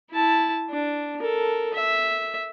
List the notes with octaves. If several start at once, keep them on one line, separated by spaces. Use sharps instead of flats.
E4 A5
D4
A4 A#4
E5